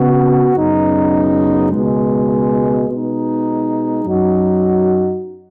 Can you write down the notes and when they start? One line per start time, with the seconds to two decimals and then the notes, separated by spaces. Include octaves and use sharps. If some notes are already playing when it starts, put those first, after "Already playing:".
Already playing: C#3 B3 F#4
0.56 F#2 C#3 B3 D#4
1.71 C#2 B2 G#3
2.89 B2 G#3 D#4
4.05 F#2 F#3 D#4 F#4